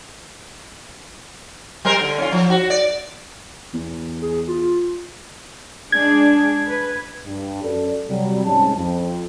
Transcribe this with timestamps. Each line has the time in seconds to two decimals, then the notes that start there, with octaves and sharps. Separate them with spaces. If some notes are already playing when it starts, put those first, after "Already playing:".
1.85 G3 A#4 C5
2.01 D3
2.18 C#4 F4
2.32 F3
2.50 F#4
2.70 D5
3.74 E2
4.22 G#4
4.48 F4
5.92 G#3 D4 G#4 G#6
6.66 B4
7.26 G2
7.63 F#2 A4 D5
8.09 C3 F#3 G3
8.45 C2 G#2 G#3 C#4 A5
8.77 F2